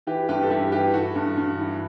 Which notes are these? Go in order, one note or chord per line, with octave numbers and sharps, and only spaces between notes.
E3 G4 B4
G2 G4 B4
A4
G2 E4 G4
E3 G4 B4
E3 F#4 A4
G2
G2
E3